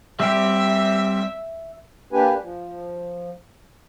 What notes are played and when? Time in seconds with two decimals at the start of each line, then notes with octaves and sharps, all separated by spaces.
0.20 G3 C4 G4 E5
2.13 A#3 D4 G4 B4 G#5
2.42 F3